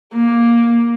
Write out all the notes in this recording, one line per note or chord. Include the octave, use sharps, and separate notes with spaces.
A#3